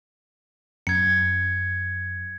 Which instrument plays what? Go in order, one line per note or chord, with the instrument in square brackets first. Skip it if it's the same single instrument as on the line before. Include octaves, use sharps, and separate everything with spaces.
[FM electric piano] F#2 [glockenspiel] G#6 C#7